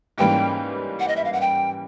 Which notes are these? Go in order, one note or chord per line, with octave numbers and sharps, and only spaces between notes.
G#2 E3 G3 A#3 C#4 G5
F#5
D#5
E5
F5
F#5
G5